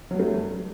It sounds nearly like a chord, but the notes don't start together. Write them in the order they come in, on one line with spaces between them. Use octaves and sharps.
F#3 G2 A3